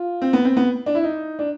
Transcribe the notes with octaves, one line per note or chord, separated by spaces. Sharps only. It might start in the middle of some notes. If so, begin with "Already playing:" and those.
Already playing: F4
C4
B3
C4
B3
D4
E4
D#4
D4